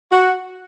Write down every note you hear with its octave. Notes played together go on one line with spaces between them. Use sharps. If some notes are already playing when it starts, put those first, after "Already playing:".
F#4